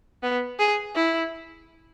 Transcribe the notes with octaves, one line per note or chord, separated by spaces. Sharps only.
B3
G#4
E4